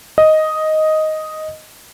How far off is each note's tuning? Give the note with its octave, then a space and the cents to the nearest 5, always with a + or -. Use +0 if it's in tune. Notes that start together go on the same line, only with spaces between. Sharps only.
D#5 +5